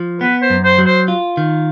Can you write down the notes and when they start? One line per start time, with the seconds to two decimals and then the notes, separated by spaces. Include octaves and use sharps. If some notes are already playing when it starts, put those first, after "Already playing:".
Already playing: F3
0.21 B3 B4
0.42 C5
0.50 F#2
0.64 C5
0.78 F#3
0.86 C5
1.08 F4
1.37 D#3